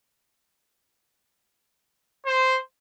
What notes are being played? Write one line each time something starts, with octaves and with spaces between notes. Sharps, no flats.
C5